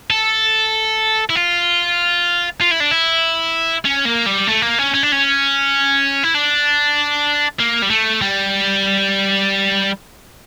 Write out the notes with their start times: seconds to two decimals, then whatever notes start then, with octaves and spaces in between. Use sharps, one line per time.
0.10 A4
1.30 E4
1.35 F4
2.61 F4
2.71 E4
2.80 D4
2.91 E4
3.85 C#4
4.06 A#3
4.26 G3
4.48 A3
4.62 A#3
4.79 C#4
4.94 C#4
5.03 D4
5.12 C#4
6.23 E4
6.34 D4
7.59 A#3
7.82 G3
7.90 A3
8.22 G3